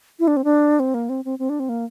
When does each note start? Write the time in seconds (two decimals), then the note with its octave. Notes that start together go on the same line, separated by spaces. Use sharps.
0.19 E4
0.27 D4
0.37 C4
0.44 D4
0.80 C4
0.94 A#3
1.09 C4
1.25 C4
1.39 C4
1.49 D4
1.60 C4
1.69 A#3